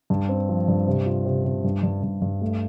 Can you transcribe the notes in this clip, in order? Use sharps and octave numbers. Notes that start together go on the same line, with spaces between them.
G2
C4
F3
G2
C3
F4
C3
C3
G2
G2
G2
G2
A3